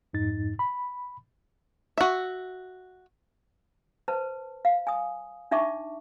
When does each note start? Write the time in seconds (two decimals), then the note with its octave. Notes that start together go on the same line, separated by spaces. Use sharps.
0.13 F2 G#2 D#4 A6
0.59 B5
1.98 F#4 E5
4.08 B4 C5 A5
4.65 F5
4.87 G#5 D#6
5.51 D4 D#4 E5 A5 C#6 D6